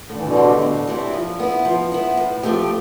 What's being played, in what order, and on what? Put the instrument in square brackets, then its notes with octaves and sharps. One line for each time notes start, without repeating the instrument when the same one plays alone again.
[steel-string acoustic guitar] A2 [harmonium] D3
[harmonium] E3
B2 D3
[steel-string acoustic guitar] E3 G3 C4 E4
A2
E3 G3 C4 E4
F3
B3 E4
F3
B3 E4
A2
F3 A3 C4 G4